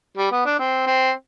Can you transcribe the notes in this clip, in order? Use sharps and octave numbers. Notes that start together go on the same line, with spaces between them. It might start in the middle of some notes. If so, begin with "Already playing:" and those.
G3
B3
D4
C4
C4